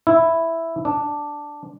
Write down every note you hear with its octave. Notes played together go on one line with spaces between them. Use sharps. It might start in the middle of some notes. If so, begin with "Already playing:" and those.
E4
D4